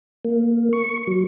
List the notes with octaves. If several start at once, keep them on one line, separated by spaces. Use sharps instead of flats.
A#3
C#6
F#3